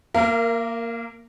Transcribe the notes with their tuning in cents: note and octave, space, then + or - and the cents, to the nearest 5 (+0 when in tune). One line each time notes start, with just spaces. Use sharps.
A#3 +0 A#4 -10 F5 -45